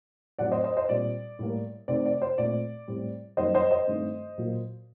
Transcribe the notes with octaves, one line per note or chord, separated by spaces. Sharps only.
A2 F#3 C4 D5 F#5
C5 D#5
C5 D#5
C5 D#5
A#2 G3 C4 D5
A2 G3 A#3
C3 D#3 A3 C4 D5
D5
C5
A#2 A3 C4 D5
A2 G3 C4
F#2 D#3 G3 A#3 C5 D#5
C5 D#5
C5 D#5
G2 D#3 A3 C4
A#2 F#3 A#3